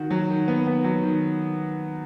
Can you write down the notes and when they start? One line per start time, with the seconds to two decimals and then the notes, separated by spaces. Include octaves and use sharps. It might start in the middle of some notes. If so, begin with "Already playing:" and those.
Already playing: D#3 F#4
0.11 F#3
0.30 D#3
0.48 B3
0.67 B3
0.84 F#3
1.03 D#3